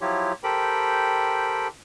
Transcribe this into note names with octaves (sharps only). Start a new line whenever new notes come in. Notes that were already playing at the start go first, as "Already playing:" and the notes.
F3 F#3 E4 F4 G4 C#5
G4 A4 A#4 C5 G5 B5